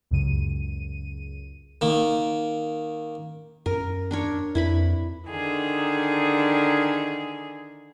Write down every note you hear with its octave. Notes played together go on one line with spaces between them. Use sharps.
C#2 F#2 C#3 D#7
D#3 A#3
F#2 A#4
D4 A#4 C#5
F2 E4 B4 B5
D3 D#3 G#4